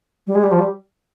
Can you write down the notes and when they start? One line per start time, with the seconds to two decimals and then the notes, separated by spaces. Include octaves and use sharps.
0.27 G3
0.35 G#3
0.43 G3
0.51 F3
0.59 G3